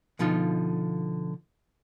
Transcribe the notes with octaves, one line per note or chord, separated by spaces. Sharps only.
B2 D3 F3 D#4 F4